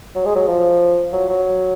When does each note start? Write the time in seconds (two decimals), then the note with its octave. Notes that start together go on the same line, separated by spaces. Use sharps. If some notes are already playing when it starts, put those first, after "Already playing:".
0.15 F#3
0.25 G#3
0.36 F#3
0.47 F3
1.12 F#3
1.29 F#3